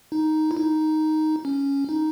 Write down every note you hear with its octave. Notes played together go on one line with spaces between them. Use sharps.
D#4
E4
D#4
C#4
D#4